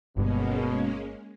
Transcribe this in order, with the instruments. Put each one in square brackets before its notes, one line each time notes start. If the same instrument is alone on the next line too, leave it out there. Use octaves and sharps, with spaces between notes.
[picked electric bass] G1 G2 [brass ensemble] B2 [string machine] G#3 A#3 C#4